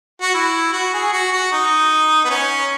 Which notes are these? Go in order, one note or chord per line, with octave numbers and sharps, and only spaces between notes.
F#4
E4
F#4
G#4
F#4
F#4
D#4
B3
C#4